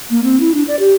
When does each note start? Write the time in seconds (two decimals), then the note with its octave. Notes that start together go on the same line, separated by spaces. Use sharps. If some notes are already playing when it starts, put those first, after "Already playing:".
0.10 A#3
0.24 C4
0.40 E4
0.54 D4
0.68 D5
0.79 G4